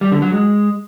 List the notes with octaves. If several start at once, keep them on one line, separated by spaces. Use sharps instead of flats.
G3
D3
F#3
G#3